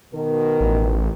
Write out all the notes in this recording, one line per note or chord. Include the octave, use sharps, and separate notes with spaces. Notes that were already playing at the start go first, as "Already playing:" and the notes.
B2 D#3 A#4
A1